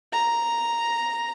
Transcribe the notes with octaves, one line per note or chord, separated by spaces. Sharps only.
A#5